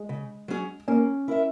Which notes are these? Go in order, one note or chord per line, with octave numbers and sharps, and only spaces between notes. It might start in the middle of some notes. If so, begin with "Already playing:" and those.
Already playing: G#3
C#3
F#3 C#4 G#4
A#3 C#4
E4 A#4 E5